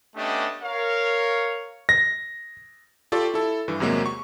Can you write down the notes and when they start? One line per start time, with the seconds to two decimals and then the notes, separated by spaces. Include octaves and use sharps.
0.16 A3 B3 C#4 D4 G4 D#5
0.62 A#4 C#5 F5
1.89 A#6
3.12 F4 G4 A4 D5 C#6
3.34 E4 A4
3.68 G2 E3
3.80 E2 C3 F#3 G#3 A#3
4.06 C#6